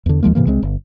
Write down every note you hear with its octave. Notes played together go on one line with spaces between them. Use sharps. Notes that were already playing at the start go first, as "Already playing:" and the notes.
E2 D3
D#2 F3 G#3 A#3
G#2 C3 E3 A#3
C2 G#3 C4
G1